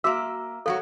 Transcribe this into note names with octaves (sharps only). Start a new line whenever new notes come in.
A#3 F#4 E5 D6 E6
G#2 F#3 F#4 A4 F5